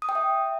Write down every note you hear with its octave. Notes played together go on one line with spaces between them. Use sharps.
D#6
G5
E5